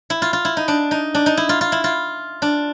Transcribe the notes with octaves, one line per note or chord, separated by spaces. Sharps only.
E4
F4
F4
E4
D#4
D4
D#4
D4
D#4
E4
F4
F4
E4
F4
D4